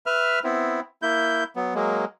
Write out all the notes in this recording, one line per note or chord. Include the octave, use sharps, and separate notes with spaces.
B4 E5 F6
B3 C4 E4
A#3 E4 G6
F#3 B3
F#3 G#3 A#3